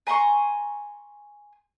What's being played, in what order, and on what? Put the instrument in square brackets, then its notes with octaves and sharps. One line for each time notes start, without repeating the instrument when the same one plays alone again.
[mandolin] G#5 A#5 C6 C#6